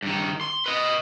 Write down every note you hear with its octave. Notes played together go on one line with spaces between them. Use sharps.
G2 D#3
C6
B4 D#5